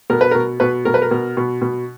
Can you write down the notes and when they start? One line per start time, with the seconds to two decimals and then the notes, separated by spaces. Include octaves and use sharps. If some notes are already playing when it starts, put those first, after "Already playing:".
0.10 B2 A#4
0.21 B4
0.31 B2 A#4
0.60 B2 B4
0.85 B2 A#4
0.94 B4
1.02 A#4
1.11 B2
1.37 B2
1.62 B2